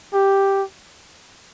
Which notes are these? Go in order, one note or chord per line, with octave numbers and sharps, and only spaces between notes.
G4